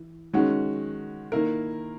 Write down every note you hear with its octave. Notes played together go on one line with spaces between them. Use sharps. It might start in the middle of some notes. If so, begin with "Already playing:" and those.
Already playing: E3
D#3 G#3 C#4 F#4
D#3 A#3 E4 A#4